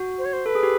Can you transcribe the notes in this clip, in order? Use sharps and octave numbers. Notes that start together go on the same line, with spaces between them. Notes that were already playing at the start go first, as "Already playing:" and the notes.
Already playing: F#4
C5
C#5
C5
A4 B4
G#4
G4